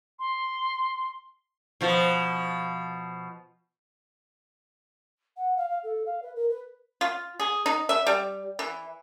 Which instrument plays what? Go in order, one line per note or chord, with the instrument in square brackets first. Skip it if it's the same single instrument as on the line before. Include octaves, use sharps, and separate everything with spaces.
[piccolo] C6
[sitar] B2 F3
[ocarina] F#5
F5
F5
A4
F5
B4
A#4
B4
[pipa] F4
G#4
D#4
E5
G3
E3